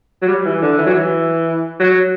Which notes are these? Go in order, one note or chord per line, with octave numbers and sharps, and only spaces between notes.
F#3
G3
E3
D3
E3
F#3
E3
F#3